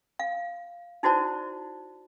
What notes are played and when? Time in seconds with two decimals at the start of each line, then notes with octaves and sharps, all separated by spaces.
0.19 F5
1.03 D#4 E4 F#4 C5 D5 A5